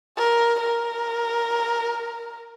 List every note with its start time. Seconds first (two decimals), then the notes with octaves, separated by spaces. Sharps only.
0.17 A#4
0.60 A#4